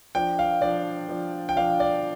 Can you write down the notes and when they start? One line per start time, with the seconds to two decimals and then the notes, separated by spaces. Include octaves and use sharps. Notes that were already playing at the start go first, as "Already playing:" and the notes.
0.15 F3 D4 G5
0.39 F5
0.61 F3 D4 D5
1.09 F3 D4
1.49 G5
1.56 F3 D4 F5
1.80 D5